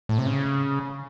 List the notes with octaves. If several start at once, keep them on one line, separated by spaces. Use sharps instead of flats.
A2
C3
C#3